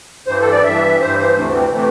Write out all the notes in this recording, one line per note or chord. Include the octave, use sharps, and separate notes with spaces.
G2 E3 C5
A4
D5
G2 E3 E5
G2 E3 C5
C5
D2 C3 E3 A3
C4
C3 E3 A3